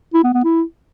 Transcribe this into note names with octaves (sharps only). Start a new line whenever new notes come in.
E4
B3
B3
E4